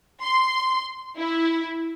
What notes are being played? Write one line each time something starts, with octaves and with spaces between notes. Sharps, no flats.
C6
E4